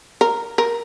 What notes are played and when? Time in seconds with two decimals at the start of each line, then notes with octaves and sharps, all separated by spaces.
0.21 A#4
0.58 A#4